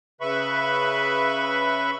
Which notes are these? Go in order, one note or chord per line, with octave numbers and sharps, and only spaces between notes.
C#3 B4 E5 B5 C#6